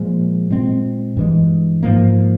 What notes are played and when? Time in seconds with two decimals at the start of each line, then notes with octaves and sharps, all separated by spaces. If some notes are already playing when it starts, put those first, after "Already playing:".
Already playing: A#2 F3 G#3
0.51 A#2 G#3 C4
1.17 G2 E3 G#3
1.83 G#2 F3 A#3